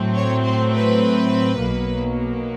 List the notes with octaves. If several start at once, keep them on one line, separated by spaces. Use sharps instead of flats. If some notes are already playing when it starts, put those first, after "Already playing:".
Already playing: A2 F#3 A3 C4
C#5
C5
B4
B1 B2 F#3 A#3